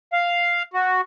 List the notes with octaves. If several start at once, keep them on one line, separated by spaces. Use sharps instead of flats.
F5
F#4